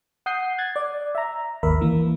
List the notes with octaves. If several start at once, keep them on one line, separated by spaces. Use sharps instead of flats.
F#5 D#6 G6 C7
F#6 G#6 A6
D5
E5 A#5
G#1 D#2 A#4 E5 B5
E3 A#3